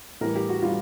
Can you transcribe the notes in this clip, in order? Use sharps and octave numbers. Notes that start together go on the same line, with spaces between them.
A2 E3 G3 A#4
G4
F#4
E3 G3 F4